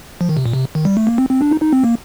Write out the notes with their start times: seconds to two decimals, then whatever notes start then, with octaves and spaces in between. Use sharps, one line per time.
0.21 F3
0.29 D#3
0.37 C3
0.46 A#2
0.53 C3
0.75 D#3
0.85 G3
0.97 A3
1.07 A#3
1.18 C4
1.30 C4
1.41 D4
1.51 D#4
1.62 D#4
1.73 C4
1.84 A#3